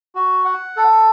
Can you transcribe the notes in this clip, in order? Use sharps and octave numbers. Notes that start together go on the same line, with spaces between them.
F#4
F#5
A4